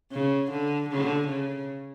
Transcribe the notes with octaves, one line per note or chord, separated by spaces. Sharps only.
C#3
D3
D3
C#3